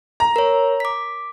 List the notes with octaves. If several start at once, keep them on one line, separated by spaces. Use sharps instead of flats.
A#5
A#4 C#5
D6 B6